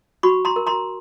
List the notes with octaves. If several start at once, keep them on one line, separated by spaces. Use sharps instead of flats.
F#4 B5 C#6
A#5 C6
A#4
A#5 C6